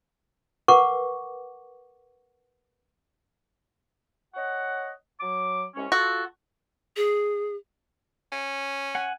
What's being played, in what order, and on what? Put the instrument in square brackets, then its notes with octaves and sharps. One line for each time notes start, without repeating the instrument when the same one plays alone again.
[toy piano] A#4 B4 F#5 C#6 D6
[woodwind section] C#5 D#5 F#5
F#3 D6
C2 G#3 C#4
[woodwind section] F4 A4 [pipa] F#4
[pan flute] G#4
[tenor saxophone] C#4
[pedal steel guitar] F#5 G#5